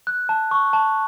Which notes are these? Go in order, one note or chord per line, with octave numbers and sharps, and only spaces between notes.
F#6
A5
C#6
A5